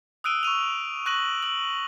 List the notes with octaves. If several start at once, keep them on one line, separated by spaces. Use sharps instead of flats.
D#6 E6 F#6 D7 D#7 G7
C#6 E6 D#7 F7
C#6 F#6 A#6 D#7 F#7
E6 F#7